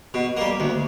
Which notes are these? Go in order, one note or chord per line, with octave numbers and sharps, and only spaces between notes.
B2
G3 A#3
D2